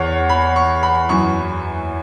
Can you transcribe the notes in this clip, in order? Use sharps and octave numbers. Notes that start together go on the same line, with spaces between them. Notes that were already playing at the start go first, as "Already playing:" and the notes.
Already playing: E2 E3 C#5
B5
C#6
B5
F#2 E3 C#6